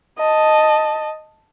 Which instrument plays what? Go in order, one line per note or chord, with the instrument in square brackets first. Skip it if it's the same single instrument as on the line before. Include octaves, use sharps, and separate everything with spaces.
[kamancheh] D#5 A5